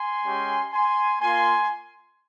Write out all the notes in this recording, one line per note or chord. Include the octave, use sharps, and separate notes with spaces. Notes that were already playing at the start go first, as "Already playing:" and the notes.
Already playing: G#5 C6
G#3 C#4 G4
G#5 C6
A#3 F4 G#5 C6